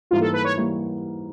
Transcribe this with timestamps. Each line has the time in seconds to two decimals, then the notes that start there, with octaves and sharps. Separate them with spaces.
0.11 G#2 E3 G3 A#3 F4
0.21 A4
0.33 B4
0.45 C#5
0.57 E3 G3 A#3